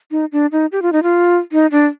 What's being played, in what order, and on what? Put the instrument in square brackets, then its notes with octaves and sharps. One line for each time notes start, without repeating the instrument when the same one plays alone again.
[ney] D#4
D4
D#4
G4
F4
D#4
F4
D#4
D4